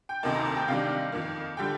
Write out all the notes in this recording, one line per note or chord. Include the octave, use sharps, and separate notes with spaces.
G5
D2 C3 D#3 A#3 D#4 A5
A#5
A5
G5
C3 D#3 G3 D4 F5
F2 D#3 A#3
D3 G3 G5